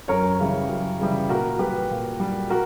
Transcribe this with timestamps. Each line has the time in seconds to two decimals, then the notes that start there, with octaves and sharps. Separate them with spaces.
0.08 F#2 A#4 C#5
0.39 C#3 E3 G3
0.68 F#2
0.99 C#3 E3 G3
1.29 A#2 F#4 A#4
1.59 G3 G4 B4
1.91 A#2
2.20 G3
2.50 F#4 A#4